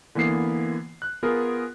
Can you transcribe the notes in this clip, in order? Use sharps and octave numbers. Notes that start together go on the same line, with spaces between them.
D3 E3 A#3 B3 C7
F#6
B3 F4 G#4 A#4